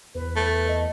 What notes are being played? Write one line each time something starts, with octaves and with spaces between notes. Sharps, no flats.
E2 B4
A3
D#5